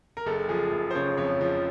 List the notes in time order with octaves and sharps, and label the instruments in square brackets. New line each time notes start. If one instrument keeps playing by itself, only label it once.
[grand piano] A#4
F#1 A4
F3 G#4
F#1
C5
C#3 C#5
F2 C#5
F3